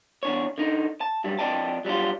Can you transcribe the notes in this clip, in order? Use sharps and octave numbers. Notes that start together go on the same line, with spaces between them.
E2 D4 C#5
D3 D#4
A5
G2 F#3 G3
F2 G#3 D5 D#5 G5 A5
F#3 G3 D4 F4